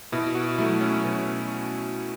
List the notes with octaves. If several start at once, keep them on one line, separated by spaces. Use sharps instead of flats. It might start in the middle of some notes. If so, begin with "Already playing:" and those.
B2 E4
F#4
F#3 A3 E4
C#4
B2 C#4